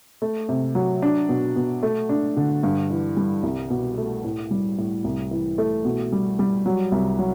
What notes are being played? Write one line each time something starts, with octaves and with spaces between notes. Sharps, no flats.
A3
C3
F#3
D4
B2
B2
A3
D4
D3
G2
E3
G3
C2
B2
A3
A2
G3
A2
C2
E3
A3
B2
G3
G3
F#3
C2
F#3